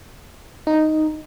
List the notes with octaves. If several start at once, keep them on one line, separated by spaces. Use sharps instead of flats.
D#4